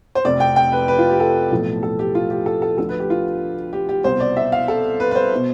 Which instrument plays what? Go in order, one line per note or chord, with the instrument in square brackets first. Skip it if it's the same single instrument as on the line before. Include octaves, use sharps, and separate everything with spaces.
[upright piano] C5
F1 F2 C3 D5
G5
G5
B4
B4
F4
G4
A4
B1 A2 F3
A4
G4
F4
G4
A4
A4
D2 D3 F3 A4
B4
G4
F4
G4
G4
C2 B2 C5
D5
E5
F5
A4
B4
B4
C5
B2